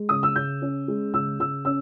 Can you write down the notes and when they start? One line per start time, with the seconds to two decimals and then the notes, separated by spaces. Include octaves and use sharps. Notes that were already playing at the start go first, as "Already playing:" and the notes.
Already playing: G#3
0.09 C#3 D#6
0.23 E6
0.36 C#3 G6
0.62 C#4
0.88 G#3
1.14 C#3 E6
1.39 C#3 E6
1.65 C#4 E6